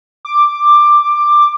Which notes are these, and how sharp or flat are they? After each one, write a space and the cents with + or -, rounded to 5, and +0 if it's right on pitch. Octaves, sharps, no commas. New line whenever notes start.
D6 +10